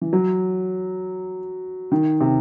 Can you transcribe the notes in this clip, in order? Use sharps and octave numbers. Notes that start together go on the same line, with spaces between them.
E3
F#3
D#3
C3